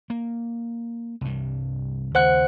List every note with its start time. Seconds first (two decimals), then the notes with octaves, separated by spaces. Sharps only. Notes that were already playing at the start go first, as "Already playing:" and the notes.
0.10 A#3
1.21 C2 G2
2.15 D#2 C#3 C5 F#5 F#6